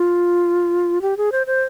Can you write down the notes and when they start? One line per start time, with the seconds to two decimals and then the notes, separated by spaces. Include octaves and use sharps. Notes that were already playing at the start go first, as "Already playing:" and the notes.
Already playing: F4
1.02 G4
1.17 G#4
1.32 C5
1.47 C5